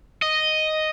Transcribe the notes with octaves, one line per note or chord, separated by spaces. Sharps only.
D#5